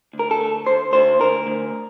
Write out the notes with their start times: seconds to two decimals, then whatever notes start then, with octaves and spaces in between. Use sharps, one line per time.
0.13 D2
0.19 A#4
0.31 A4
0.41 A3
0.66 D2 C5
0.93 D2 C5
1.20 D2 A#4
1.47 D2